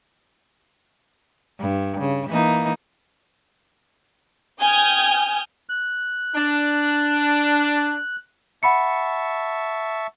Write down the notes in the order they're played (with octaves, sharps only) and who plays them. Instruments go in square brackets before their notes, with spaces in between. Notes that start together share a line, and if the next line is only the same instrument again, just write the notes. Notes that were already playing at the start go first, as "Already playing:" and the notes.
[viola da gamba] G2
C#3
E3 A#3 D#4
[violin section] G5 G#5 D#6 F6 G6 G#6
[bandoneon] F#6
[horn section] D4
[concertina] E5 A5 C#6 [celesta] F#5 B5 C#7